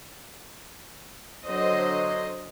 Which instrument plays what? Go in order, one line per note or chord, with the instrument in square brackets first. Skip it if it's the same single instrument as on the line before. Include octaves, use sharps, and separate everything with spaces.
[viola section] D3 F#3 C5 D#5